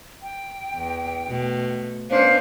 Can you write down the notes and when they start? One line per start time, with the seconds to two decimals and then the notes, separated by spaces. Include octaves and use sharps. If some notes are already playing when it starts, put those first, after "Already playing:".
0.22 G5
0.75 E2
1.28 B2 A3
2.10 B3 C#4 D4 C5 F5